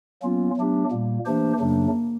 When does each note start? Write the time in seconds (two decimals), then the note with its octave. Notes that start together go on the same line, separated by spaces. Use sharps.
0.22 F#3 A#3 B3 C#4 F4
0.57 F#3 A3 D4 G4
0.91 A#2 G3 A#3
1.26 E3 A3 A#3 D4 G4 C5
1.60 F#2 C#3 F#3 A3 D4